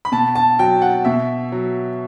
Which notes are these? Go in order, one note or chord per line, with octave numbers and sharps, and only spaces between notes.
B5
B2 A5
A5
F#3 G5
F#5
B2 E5
F#3